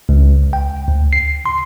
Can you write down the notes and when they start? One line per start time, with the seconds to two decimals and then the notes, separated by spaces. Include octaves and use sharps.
0.09 C#2
0.53 G5
0.88 D2
1.13 C7
1.46 C6